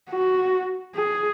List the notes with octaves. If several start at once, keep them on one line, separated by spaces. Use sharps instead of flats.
F#4
G#4